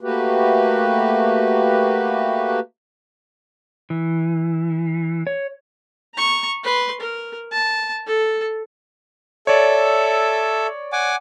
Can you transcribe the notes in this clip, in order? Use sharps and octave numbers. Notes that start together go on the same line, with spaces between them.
A3 A#3 F#4 G4 B4
E3
C#5
A#5 C#6
B4 C6
A#4
A5
A4
A4 C#5 D5 E5
F#5 G#5 D6